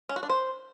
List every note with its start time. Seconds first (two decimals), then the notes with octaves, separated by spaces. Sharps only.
0.09 C#4
0.16 F#4
0.23 D4
0.29 C5